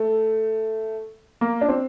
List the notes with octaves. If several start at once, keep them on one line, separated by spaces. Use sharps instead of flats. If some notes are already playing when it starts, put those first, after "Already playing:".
Already playing: A3
A#3
D4
C4